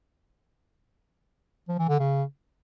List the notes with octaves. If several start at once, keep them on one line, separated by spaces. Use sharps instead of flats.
F3
E3
D3
C#3